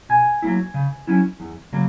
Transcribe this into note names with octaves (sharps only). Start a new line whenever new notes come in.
B2 G#5
F#3 A#3 E4
C#3
F#3 C#4 E4
E2
C#3 F#3 A#3